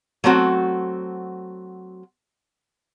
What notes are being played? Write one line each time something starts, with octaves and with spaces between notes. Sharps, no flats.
F#3 A3 C4 F#4